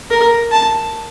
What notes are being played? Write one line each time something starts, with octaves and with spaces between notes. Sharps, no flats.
A#4
A5